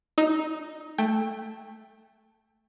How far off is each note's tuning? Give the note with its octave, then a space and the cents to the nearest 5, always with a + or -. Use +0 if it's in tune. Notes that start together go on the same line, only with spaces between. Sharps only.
D#4 +0 D#6 +40
A3 +0 G5 +25